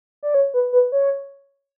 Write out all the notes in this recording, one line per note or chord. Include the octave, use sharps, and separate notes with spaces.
D5
C#5
B4
B4
C#5